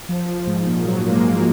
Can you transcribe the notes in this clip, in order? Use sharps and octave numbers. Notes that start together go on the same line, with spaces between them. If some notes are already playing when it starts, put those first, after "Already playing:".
F3
F3
G#2
A#2
F#3
A#3
G#3
A#3